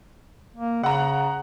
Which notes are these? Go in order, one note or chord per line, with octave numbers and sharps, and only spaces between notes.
A#3
C#3 F#5 A#5